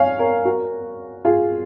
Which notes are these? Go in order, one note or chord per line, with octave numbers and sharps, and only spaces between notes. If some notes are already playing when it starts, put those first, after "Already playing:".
Already playing: C#5 F5 G#5
A#4 C#5
F#4 A#4
F4 G#4